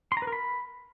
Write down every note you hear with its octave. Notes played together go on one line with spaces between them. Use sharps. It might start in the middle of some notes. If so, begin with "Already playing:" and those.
C6
A#5
B4
A#4
B5